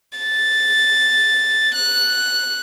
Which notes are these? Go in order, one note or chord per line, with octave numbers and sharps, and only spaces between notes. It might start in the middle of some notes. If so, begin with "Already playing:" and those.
A6
F#6